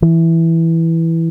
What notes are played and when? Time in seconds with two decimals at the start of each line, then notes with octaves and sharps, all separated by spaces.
0.02 E3